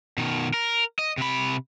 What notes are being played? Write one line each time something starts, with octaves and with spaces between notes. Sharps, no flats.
B2 D#3
A#4
D#5
C3 B5